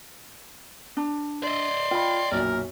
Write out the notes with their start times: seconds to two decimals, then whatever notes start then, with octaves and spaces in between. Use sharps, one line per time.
0.97 D4
1.43 D5 D#5 C6
1.91 F4 G5 B5
2.32 B1 F#2 A#2 A#4